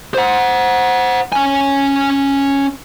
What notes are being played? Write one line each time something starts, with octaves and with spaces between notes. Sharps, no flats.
C5 F#5
C#4 G#5